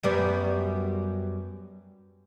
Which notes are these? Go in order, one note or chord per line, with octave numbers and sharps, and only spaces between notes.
F#2 G3 B3